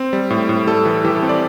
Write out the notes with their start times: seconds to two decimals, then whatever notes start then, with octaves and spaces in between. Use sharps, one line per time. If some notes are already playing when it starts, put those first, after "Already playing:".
Already playing: C4
0.13 G3
0.30 A2
0.49 A2
0.67 G3 A4
0.85 E3
1.05 E3 G4
1.16 A4
1.22 C4
1.29 D5